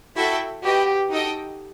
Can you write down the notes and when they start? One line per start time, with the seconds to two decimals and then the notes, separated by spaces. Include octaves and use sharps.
0.16 E4 F#4 A4 E5 G5
0.63 F#4 G4 B4 D#5 G5
1.11 D#4 F#4 A4 D#5 G5